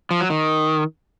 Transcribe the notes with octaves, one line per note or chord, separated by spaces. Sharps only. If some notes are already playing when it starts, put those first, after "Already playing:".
F3
F#3
D#3